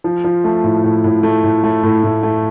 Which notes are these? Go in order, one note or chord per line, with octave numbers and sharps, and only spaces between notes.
F3
F3
A3
A2
A2
A2
A3
A2
A3
A2
A2
A3